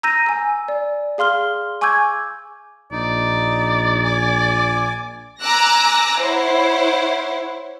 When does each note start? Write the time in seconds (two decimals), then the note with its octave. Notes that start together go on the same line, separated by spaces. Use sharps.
0.03 A#5 E6 G6 A#6 D#7
0.26 G#5 E6
0.68 D5
1.18 G#4 F5 C6 F6 G7
1.81 G#5 C#6 D6 E6 G6 G#6
2.91 A#1 D#4 D5
4.04 G#5 D6
5.41 G#5 A#5 D6 E6 F#6 A#6
6.20 E4 C5 C#5 F#5